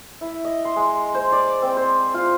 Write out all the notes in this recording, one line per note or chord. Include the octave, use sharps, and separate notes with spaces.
E4
D#5
C6
G#3
C5
D5
C4
C5
F4